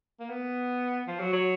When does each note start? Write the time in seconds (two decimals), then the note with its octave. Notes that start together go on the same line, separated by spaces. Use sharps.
0.20 A#3
0.30 B3
1.07 F3
1.20 F#3
1.33 F#3